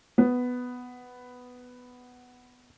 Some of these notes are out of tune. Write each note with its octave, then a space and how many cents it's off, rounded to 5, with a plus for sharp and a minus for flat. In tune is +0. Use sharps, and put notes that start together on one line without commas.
B3 +5